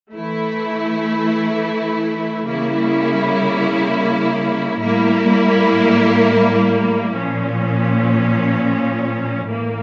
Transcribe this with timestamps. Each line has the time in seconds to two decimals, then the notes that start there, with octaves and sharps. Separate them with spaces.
0.14 E3 A3 E4
2.47 C#3 G3 A#3 E4
4.81 A2 G3 A#3 E4 A#4
7.14 A#2 F3 C#4
9.47 A2 E3 A#3